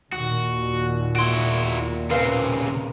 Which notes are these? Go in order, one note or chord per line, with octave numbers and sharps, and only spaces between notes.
D#2 A#2 F#4
E4 F#4 C6 D7
C#3 C4 A#4 B4 F5